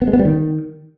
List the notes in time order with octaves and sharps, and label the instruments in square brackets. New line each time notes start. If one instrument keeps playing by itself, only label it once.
[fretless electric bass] B3
G#3
B3
G3
D#3